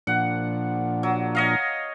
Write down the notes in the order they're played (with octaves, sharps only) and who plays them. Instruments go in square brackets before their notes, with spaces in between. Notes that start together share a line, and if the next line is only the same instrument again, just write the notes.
[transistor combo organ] A#2 F3 D4 [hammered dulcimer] F#5
[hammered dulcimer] F#3
C#5 D#5 F5